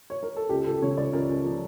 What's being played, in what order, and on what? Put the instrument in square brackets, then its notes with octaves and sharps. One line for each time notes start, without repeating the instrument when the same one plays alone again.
[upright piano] C#5
A#4
A4
C#2 G4
C#2 A4
C#3 C#5
C#2 D5
C#2 A#4
C#2
F3